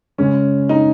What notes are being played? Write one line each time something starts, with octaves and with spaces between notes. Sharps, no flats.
C#3 G#3 C#4
D#4